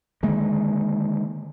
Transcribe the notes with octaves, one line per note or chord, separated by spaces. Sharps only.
D3 D#3 G#3 A#3